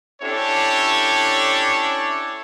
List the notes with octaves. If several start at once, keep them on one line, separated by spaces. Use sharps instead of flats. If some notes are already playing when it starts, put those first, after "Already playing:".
C#4 D4 E4 G4 A4 C#5